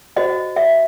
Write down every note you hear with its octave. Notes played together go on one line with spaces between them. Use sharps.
F#4 C5 D#5
E5